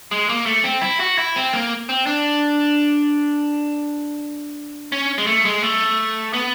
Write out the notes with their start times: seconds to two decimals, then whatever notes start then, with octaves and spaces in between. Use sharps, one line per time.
0.11 G#3
0.29 A#3
0.46 A3
0.64 C4
0.82 E4
1.00 F#4
1.18 E4
1.36 C4
1.53 A#3
1.89 C4
2.06 D4
4.92 C#4
5.18 G#3
5.27 A3
5.45 G#3
5.63 A3
6.33 B3